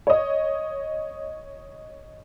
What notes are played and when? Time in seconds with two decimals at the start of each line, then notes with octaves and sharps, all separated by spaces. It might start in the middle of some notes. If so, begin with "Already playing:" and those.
0.07 C#5 D#5